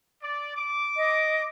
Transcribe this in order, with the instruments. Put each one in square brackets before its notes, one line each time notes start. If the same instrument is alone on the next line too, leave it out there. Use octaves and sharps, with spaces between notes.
[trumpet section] D5
D6
[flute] D#5